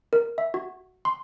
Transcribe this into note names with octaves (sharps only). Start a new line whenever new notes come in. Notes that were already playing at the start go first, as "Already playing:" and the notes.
A#4
E5
F#4
C6